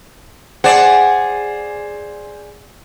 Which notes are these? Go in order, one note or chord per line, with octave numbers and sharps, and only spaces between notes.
G#4 C5 D5 F#5 E7